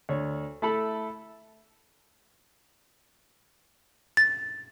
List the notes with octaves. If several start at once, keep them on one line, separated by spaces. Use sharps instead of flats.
D2 C#5
A3 E4 A4 B5
A6